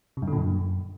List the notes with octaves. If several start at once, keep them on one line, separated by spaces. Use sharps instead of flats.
C3
G2
D3
A#2
F#2